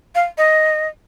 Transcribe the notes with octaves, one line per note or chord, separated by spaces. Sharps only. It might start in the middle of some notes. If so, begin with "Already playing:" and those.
F5
D#5